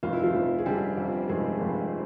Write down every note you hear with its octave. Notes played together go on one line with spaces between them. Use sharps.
F1 F4
E4
F3 F4
F1
G#4
D3 G3 G4
F2
F1 G#3 G#4
F1